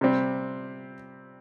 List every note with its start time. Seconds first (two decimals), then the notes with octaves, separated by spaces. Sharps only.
0.01 C3 G3 C4